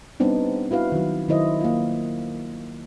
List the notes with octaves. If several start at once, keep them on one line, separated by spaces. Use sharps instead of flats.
G3 B3 C4 D4 D#4
E4 F#4 B4 F5
D#3 F#3
D#3 F#3 E4 C5 D#5
A#3 F4